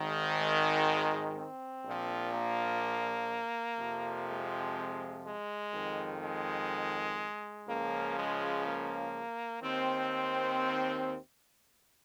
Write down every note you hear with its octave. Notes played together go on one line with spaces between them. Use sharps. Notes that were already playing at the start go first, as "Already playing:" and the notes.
Already playing: G#1 G#2 D#3
G#3
C4
A#1 A#2 F3
A#3
F2 C3 F3
G#3
G#3
F2 D#3
G#3
C#2 C#3 F3 A#3
G#3
A#3
D#2 D#3 C4